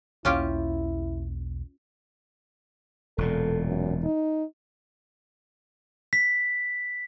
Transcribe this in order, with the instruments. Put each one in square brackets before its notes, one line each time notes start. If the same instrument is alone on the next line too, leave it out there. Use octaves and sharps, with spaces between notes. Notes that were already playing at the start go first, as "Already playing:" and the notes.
[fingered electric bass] B1 E2 A#3 [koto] C#4 F4 G4 [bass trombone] E4
[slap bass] E1 A#2 [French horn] A4
[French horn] F#2
D#4
[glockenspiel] B6